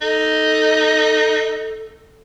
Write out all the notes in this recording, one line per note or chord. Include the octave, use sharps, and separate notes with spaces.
D#4 A4